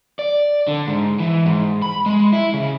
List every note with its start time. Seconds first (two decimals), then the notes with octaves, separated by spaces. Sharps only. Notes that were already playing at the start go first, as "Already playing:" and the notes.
0.19 D5
0.67 D3
0.87 G#2
1.20 E3
1.46 G#2
1.82 B5
2.06 G#3
2.33 E4
2.54 C#3